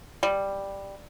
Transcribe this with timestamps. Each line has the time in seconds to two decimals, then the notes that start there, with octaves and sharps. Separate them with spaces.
0.23 G3